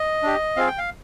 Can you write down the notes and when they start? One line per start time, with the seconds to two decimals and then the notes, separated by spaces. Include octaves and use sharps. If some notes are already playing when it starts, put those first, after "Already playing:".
Already playing: D#5
0.23 D4 G4
0.56 C4 F4 G#4 F5
0.67 G5
0.78 F5